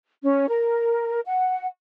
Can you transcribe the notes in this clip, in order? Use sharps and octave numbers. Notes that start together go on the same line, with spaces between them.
C#4
A#4
F#5